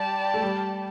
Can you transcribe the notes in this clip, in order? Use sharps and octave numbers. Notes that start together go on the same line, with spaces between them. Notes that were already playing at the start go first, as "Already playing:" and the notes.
Already playing: G3 G4 D5 A5
A3
G3